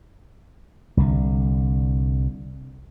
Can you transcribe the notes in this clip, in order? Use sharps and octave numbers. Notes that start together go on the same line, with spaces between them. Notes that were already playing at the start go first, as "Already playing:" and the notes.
C2 D3